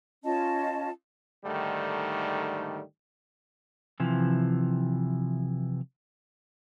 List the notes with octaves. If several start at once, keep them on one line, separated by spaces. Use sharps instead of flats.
C#4 F4 D#5 A5
G#2 D3 D#3 G3 A3
C3 E3 F3